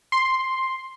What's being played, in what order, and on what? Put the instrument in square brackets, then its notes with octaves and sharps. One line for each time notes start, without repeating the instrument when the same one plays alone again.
[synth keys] C6